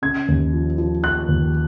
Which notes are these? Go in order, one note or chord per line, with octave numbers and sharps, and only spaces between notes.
C#3 G#6
D#2
F3
F3
F3 F#6
D#2